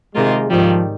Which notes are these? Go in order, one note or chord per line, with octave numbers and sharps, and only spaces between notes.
C3 D#3 G#3 A#3 F4
G#2 D#3 F3 G3